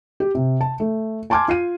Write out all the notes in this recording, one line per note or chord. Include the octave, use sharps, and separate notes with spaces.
G4
C3
A5
A3
G#5 A5 C6 D6 F6 G#6
F4 C7 D#7